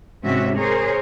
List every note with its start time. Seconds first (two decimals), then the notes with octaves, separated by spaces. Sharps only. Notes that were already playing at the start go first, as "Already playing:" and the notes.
0.24 G#2 C3 G#3 C#4 F#4 E5
0.58 G#4 A#4 C5 C#5